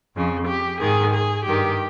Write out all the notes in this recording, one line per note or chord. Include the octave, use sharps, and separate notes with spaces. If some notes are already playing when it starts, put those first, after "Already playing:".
F2 C#3
G4
G#2 D#3 G#4
G#4
G2 D#3 G4